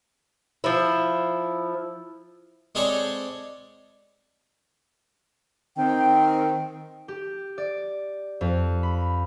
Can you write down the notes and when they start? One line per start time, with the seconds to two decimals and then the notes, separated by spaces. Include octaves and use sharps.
0.64 F3 E4
2.75 G#3 C4 G#4 A4 C#5 D5
5.77 D#3 C4 G5
7.08 G4
7.58 D5
8.41 F2
8.83 B5